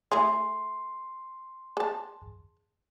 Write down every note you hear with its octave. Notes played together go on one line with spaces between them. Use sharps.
A3 E4 G#4 C6
G#4 A5